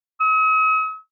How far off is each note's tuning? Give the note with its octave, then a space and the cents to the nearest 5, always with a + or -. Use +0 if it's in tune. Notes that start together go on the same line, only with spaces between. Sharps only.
D#6 +45